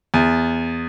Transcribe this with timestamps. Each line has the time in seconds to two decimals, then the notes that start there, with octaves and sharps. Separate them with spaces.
0.14 E2